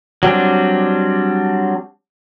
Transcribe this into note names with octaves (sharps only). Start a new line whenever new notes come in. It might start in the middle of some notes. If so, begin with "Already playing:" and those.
F#3 G3 C4 D4